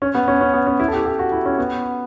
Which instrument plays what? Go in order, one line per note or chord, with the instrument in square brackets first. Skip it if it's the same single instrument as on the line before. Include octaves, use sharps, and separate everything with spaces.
[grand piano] C#4
B3
C#4
C#4
B3
C#4
E4
A4
G4
G4
F#4
E4
C#4
B3